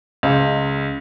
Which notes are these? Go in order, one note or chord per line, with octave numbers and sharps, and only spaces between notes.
C#2